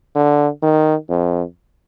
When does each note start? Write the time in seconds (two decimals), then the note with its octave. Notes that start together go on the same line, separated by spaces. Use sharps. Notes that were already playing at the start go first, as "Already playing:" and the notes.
0.15 D3
0.62 D#3
1.09 F2